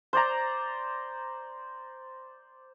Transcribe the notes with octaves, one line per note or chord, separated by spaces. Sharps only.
C5 D5 A#5